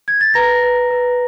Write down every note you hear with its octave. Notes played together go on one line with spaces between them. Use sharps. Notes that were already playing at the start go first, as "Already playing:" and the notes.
G#6
A6
B4 A#5 A#6
B4
B4